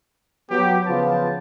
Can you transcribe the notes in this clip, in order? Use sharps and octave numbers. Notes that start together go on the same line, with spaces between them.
F#3 B3 G4
C#3 F3 B3 F4 C5 A5